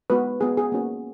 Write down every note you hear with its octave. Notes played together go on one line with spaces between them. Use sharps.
G#3 B3 F#4 B4
G#3 B3 F#4 G#4
G#4
A#3 C#4 F#4